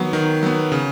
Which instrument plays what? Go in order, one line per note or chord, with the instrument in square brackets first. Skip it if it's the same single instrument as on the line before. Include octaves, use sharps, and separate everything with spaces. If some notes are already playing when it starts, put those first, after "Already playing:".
Already playing: [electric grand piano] D#3 F#3 B3
D#3
F#3 B3
C#3